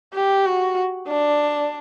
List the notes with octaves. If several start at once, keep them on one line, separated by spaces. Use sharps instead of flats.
G4
F#4
D4